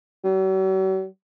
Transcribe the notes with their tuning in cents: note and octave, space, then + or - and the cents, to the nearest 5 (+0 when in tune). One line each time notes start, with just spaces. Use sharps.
F#3 +45